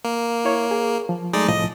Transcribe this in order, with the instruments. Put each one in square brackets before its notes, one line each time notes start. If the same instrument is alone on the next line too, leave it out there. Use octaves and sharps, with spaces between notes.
[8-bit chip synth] A#3
[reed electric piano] E4 C#5
G#4
F3
[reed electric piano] F#3 A3 [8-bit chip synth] G#3 D#4 D5
[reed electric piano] C2 A2 F3 [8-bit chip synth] D#5